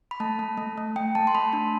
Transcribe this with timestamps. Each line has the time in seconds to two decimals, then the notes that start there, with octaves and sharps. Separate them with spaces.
0.11 B5
0.20 A3 A5
0.39 A3
0.57 A3
0.77 A3
0.96 A3 G5
1.15 A3 A5
1.27 C6
1.35 A3 B5
1.53 D4 A5